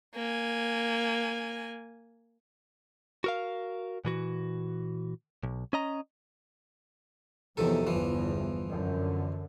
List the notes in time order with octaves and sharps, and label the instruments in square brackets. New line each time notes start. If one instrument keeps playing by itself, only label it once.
[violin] A#3 G#5
[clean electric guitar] F#4 A#4 F5
A#2 E3 F#4
B1
C#4 D#5 A#5
[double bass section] E2 F3 F#3 [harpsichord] C3 D#3 A4
[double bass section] G1 E2 [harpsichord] E3 F3
[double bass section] F#2 D3